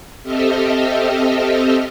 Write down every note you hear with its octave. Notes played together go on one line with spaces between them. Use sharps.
C4 G4 A4 D#5 E5 F6